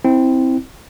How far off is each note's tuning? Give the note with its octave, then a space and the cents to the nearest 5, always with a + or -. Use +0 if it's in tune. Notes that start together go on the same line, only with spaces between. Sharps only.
C4 +0 E4 -20